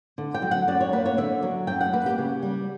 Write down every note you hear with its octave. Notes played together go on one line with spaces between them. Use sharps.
D3
G5
F#3
F#5
F#2 D5
C#5
A#3 B4
C#5
D3 E5
F#3
F#2 G5
F#5
A#3 B4
G4
C#3
G3